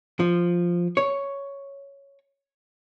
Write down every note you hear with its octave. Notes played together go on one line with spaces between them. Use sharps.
F3
C#5